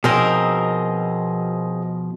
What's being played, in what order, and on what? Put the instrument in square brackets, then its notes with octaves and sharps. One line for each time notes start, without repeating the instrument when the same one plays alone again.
[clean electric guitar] B2 F3 [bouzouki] C4 D#4 A#4 [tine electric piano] G#4 C5 D#5